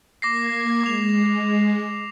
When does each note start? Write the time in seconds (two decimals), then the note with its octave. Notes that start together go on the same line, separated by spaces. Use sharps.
0.22 A#3 D6 G#6 A#6 C7
0.83 G#3 D6 F7